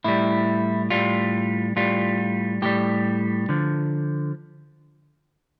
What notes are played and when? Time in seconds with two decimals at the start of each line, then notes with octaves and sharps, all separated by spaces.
0.04 A2 G3 E4
0.90 A2 G3 F4
1.76 A2 G3 F4
2.62 A2 G3 G4
3.49 D3 F3